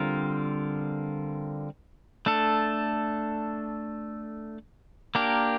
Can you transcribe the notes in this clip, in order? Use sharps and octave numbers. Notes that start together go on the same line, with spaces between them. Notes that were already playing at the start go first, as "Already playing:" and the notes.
Already playing: D3 G3 C4 F4 A#4
A3 D4 A4
A#3 D4 G4 A#4